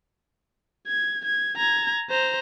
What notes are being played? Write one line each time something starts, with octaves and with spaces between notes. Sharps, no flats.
G#6
G#6
A#5 G#6
C5 A#5